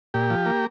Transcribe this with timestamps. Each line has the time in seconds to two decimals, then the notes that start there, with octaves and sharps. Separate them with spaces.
0.14 A#2 G4
0.30 F3
0.46 A#3